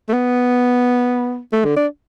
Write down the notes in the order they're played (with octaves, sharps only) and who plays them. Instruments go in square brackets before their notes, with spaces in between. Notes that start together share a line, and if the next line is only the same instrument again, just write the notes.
[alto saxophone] A3
B3
A3
D3
D4